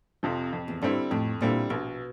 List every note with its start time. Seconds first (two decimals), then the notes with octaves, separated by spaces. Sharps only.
0.23 F2 C3 F3
0.53 F2
0.68 E2
0.82 G2 D3 G3 C4 E4
1.11 F2 A2
1.41 A#2 D3 G3 C4 E4
1.70 A#1 B2